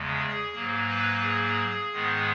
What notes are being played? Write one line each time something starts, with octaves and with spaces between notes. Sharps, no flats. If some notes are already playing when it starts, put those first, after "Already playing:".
Already playing: E2 C#3 G#3
G#4
G#2 F#3 A#3
B4
G#4
G#2 D#3 G#3 B3